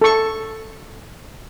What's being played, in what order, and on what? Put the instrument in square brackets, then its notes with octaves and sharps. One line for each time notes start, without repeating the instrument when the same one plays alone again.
[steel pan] A4 C#6